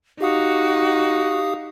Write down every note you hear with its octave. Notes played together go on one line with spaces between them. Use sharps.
D#4 F#4 G4 F5 D#6